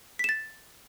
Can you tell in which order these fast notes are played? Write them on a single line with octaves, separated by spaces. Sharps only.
B6 E7 A6